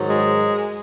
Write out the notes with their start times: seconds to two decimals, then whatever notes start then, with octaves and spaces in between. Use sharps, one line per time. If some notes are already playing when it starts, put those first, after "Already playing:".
Already playing: G#2 D#3 F#3
0.10 G#3